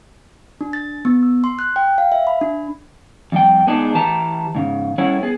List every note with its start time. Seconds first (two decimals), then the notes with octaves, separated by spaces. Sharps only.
0.61 D4
0.73 A6
1.05 B3
1.23 E6
1.44 C6
1.59 F#6
1.76 G5
1.98 F5
2.12 E5
2.27 B5
2.41 D4
3.32 F2 G3 G5
3.67 G#3 B3 D4 D#4 G#4
3.95 E3 G4 B4 A5 A#5
4.55 G#2 C#3
4.98 G3 C#4 E4 A4 C#5 F#5
5.22 B3 G#4